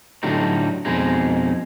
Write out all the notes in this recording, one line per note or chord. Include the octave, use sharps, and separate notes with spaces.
A2 D3 F#3 G3 D#4
F2 B2 G#3 D#4